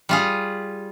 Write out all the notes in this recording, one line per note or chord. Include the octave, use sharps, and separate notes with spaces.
G3 F4 G#4